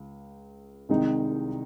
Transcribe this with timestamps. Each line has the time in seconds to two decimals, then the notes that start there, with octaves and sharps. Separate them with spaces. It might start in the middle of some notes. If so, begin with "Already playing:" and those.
Already playing: C#2
0.89 C2 C3 D#3 G#3 D#4